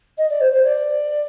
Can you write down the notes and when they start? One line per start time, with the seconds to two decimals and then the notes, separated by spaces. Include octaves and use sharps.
0.18 D#5
0.29 D5
0.40 C5
0.51 C5
0.63 D5